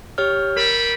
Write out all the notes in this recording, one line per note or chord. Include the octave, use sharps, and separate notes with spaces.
G4 C#5 F6
G3 A#4 G5 B5